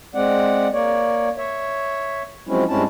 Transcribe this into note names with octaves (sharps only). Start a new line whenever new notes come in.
G#3 C4 D5 F#5
A#3 C#5 D5
C#5 E5
F3 F#3 G#3 C4 C#4 E4
G2 G#3 C4 C#4 E4 A5